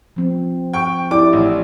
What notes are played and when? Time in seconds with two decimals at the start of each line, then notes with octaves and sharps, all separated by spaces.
0.16 F3 C4
0.73 G5 C#6
1.11 E4 G4 D5 D6
1.33 A1